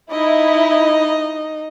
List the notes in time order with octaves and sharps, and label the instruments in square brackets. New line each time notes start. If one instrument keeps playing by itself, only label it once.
[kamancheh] D#4 D#5 [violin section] E4